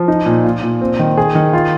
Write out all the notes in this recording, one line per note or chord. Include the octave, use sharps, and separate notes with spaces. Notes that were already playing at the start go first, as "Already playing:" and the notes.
Already playing: F3
D#4
A#2
F4
A#2
C4
D#3
G#4
D#3
F4